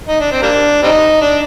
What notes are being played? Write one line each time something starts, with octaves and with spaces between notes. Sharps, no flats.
D#4
D4
C4
G3 A#3 D4
G3 C4 D#4
D4